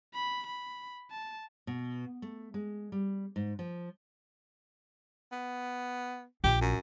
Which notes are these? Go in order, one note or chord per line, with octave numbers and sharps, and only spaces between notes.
B5
B5
A5
B2
A3
G#3
G3
G#2
F3
B3
A#1 G4
F#2